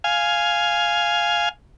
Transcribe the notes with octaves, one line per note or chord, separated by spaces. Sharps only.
F5 G#5